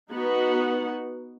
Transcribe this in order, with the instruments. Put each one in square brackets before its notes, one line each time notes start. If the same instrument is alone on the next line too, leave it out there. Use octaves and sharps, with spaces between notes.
[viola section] B3 D#4 F#4 F#5